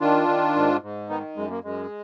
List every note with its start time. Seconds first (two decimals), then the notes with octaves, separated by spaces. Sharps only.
0.01 D#3 D4 F4
0.28 D#3
0.56 G#2
0.82 G#2
1.09 D#3 B3 D#4
1.36 F#2 G#3
1.50 A#3
1.64 F#2 G#3